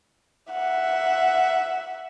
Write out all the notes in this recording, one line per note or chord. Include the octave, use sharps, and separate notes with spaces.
E5 F#5